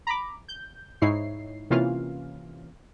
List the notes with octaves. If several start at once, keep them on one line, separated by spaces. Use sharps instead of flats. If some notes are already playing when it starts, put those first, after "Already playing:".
A#5 B5 D6
G6
G#2 D#4 E4 C#5 C7
C3 E3 A#3 C#4 F4 F5